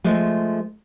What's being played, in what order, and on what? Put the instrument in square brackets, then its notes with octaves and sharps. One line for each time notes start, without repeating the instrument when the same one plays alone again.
[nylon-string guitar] F3 G#3 A3